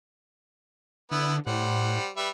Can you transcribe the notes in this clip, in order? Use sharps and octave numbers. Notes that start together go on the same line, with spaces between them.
D3 B3 E4
A2 G3 C5 F#5
G3 B4 E5